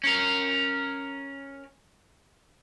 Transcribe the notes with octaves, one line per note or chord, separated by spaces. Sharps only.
C#4 A#4